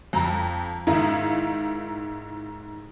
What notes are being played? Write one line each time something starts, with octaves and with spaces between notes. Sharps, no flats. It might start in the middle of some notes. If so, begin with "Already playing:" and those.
F2 A#5
G#2 D#3 D#4 E4 F5